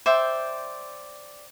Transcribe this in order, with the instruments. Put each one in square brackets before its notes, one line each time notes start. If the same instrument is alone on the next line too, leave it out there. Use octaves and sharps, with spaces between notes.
[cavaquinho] C5 D5 E5 G5